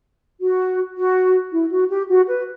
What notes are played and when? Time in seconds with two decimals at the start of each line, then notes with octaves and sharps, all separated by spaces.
0.41 F#4
0.97 F#4
1.52 E4
1.71 F#4
1.90 G4
2.09 F#4
2.27 B4